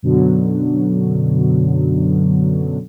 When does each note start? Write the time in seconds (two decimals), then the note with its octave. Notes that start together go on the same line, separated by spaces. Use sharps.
0.03 F#2 B2 D3 F#3